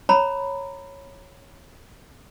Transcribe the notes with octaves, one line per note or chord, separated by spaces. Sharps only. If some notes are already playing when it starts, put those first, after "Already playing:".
C#5 A#5 B5